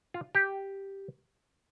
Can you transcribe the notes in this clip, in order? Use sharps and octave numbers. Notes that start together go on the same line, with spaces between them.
F4
G4